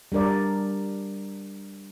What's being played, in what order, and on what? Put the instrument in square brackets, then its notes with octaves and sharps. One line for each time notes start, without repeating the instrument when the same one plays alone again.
[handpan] G3 D4 A#4 D5